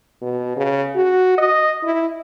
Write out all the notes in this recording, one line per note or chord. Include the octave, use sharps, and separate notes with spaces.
B2
C#3
F#4
D#5
E4